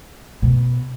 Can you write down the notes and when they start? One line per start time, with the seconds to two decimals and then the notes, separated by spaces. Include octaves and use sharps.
0.42 B2